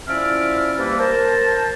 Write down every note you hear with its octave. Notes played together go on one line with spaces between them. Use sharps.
F3 C#4 E4 D5 E5 F6
C3 G3 A#3 G4 A4 B4
A#4 C5 A5